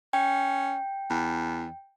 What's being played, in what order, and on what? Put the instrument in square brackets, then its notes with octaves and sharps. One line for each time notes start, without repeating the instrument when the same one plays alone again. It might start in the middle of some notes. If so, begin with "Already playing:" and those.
[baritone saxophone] C#4 [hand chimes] G5
[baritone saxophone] E2